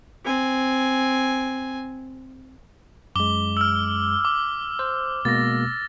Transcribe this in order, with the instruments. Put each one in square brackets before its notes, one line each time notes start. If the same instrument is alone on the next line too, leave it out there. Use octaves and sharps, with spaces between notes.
[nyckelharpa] C4 G#5
[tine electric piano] F#2 G#3 [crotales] D6 G7
[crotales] E6 F6
D6
[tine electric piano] C5
[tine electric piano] B2 G#3 A#3 [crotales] A6 A#6